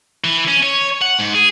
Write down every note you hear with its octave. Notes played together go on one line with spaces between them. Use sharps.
E3
C#4
C#5
F#5
G#2
G#4